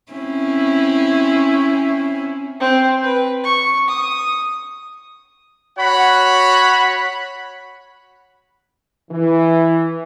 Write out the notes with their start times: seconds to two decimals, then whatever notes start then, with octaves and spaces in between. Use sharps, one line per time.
0.12 C4 C#4 E4
2.60 C4
3.03 B4
3.44 C#6
3.89 D#6
5.79 F#4 C#5 F#5 B5
9.11 E3